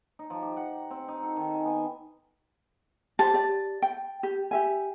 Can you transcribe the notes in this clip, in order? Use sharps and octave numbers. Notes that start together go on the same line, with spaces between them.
D#4
F3
G4
F#5
C4
D#4
A4
D#3
G#5
B3
G4 C5 A5
G4 D5
G5
G4
G4 E5 G#5